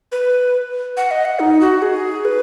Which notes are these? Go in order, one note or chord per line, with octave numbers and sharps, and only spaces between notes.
B4
F#5
D#5
F#5
D#4
F#4
G#4
B4